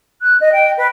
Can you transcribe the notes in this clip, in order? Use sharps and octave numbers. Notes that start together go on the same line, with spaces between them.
F#6
D#5
G5
B4